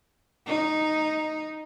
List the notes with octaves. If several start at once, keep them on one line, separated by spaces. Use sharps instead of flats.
D#4